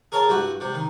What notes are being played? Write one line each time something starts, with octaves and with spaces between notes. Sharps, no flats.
G#4 A#4 C#5 G#5 A5
G2 G3 E4 F#4
C3 G3
D#3